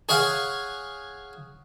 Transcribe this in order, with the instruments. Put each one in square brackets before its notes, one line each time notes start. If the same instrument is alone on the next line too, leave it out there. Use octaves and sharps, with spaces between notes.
[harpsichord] G#4 C#5 F5 F#5